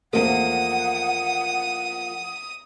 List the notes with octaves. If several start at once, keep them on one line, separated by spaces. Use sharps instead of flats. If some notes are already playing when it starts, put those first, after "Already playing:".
E2 F3 A3 A#3 F#5 D#6